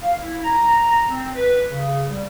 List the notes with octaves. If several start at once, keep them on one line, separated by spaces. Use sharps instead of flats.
F5
E4
A#5
C4
B4
C#3
G3